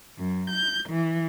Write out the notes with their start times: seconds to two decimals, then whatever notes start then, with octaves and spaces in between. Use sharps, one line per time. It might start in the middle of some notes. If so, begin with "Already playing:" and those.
0.19 F#2
0.51 G6
0.90 E3